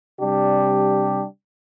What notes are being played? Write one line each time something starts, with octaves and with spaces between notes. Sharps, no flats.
C3 G3 D4 G4